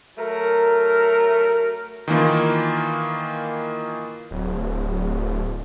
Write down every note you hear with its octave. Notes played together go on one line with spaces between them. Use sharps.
F#3 A3 A#4
D#3 E3 A#3 F4
D1